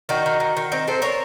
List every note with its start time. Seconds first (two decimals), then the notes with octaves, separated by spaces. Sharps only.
0.09 D#3 D#4 F#4
0.26 D#3
0.40 D#3
0.57 D#3
0.72 C4 D#4
0.87 C4 A4 C5
1.02 C4 A#4 C#5